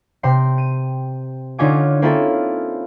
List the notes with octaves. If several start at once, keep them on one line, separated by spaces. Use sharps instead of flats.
C3 G5 C6
D#7
D3 C#4 D#4 F4 G#5 D6
A#3 C4 C#4 E4 F4 A4